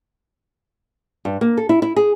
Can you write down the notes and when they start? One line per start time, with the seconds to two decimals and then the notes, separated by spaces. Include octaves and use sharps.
1.25 G2
1.41 A#3
1.57 A4
1.69 E4
1.82 E4
1.96 G#4